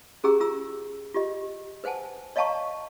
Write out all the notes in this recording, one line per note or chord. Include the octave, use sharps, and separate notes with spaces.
C#4 G4 G#4 G5 A#5 E6
F4 A#5 E6
F4 G4 D#5
B4 C5 F#5 G#5 A5
C#5 D#5 F5 A5 A#5 C#6